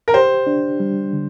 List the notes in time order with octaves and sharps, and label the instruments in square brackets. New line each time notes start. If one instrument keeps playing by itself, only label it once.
[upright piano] A#4
[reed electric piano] G4 [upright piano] C5
[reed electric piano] D4
G3
D3